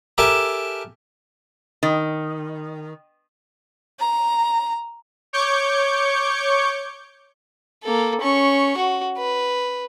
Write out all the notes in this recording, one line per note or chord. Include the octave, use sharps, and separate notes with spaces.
G4 A4 A#4 E5 G#5 A5
D#3
A#5
C#5 C#6 D6 G6 C#7
A#3 A4
C#4 C#6
F#4
B4